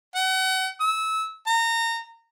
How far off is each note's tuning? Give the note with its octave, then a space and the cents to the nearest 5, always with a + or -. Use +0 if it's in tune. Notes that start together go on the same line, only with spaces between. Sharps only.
F#5 +35
E6 -25
A#5 -25